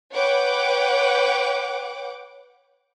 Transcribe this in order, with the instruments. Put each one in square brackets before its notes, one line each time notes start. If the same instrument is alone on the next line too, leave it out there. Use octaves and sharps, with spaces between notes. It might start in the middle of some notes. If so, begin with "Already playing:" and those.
[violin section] B4 C#5 F#5 G5 D6